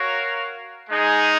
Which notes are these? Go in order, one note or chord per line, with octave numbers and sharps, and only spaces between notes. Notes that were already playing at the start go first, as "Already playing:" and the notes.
Already playing: F#4 A#4 C#5 F5
G#3 D#4 G#4